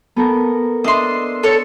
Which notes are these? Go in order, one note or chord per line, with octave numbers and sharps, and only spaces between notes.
B3 A4 A#4
D4 D#5 E5 C6
A4 C#5